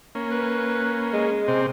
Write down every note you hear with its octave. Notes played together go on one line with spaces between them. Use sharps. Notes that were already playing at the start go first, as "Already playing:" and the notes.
A#3 C#4
B4
G#3
C3 C4